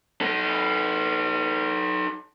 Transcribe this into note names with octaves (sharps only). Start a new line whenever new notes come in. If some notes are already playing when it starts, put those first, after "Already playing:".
D#4 A4